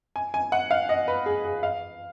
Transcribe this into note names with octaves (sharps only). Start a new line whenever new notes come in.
G#5
G#5
F#5
F5
D#5
B4
G#4
G#4
F5